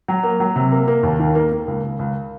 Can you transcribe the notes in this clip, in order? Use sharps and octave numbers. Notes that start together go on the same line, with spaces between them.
F#3
A#3
F#3
C3
A#3
A#3
D#2
D#3
A#3
A#3
C#2
C#2
C#2